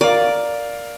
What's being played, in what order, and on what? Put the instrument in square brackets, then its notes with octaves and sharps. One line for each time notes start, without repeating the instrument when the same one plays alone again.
[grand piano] A#4 F5 [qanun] D5